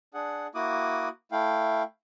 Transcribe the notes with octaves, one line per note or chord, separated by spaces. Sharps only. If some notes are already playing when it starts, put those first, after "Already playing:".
D4 G#4 F#5
A#3 E4 F#4 D6 D#6
A3 E4 F5 G5